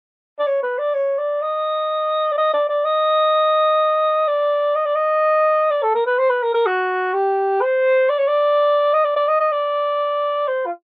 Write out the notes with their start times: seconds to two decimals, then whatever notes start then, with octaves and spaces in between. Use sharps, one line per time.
0.39 D5
0.47 C#5
0.63 B4
0.78 D5
0.94 C#5
1.18 D5
1.42 D#5
2.32 D5
2.37 D#5
2.54 D5
2.69 D5
2.85 D#5
4.28 D5
4.76 D#5
4.86 D5
4.95 D#5
5.71 D5
5.83 A4
5.95 A#4
6.06 B4
6.18 C5
6.30 B4
6.43 A#4
6.54 A#4
6.66 F#4
7.14 G4
7.61 C5
8.09 D5
8.19 C#5
8.28 D5
8.94 D#5
9.04 D5
9.16 D5
9.28 D#5
9.40 D#5
9.52 D5
10.48 C5
10.66 F4